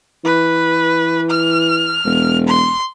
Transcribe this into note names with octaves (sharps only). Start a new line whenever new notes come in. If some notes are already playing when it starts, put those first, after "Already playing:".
E3 B4
F6
E1
C6